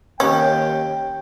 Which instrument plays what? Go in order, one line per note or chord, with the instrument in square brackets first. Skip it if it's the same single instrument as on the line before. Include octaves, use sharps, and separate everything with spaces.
[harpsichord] D#2 D6 [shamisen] C#4 [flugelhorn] G5